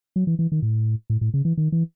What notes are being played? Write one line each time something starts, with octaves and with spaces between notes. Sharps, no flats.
F#3
E3
E3
D#3
A2
A2
A2
C#3
E3
D#3
E3